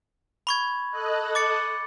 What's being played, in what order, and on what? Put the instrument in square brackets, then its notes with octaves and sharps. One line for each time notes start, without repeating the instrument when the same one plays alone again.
[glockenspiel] B5 C#6 G#6
[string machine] A4 D#5 F#6
[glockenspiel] D6 A6 C#7